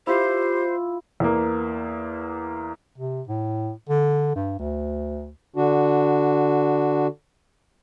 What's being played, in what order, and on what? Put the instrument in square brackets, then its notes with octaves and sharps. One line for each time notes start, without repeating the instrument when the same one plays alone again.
[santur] E4 F4 [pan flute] G4 [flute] C5
[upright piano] E2 A#3
[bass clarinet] C3
A2
D3
G2
D2
[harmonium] D3 D4 F#4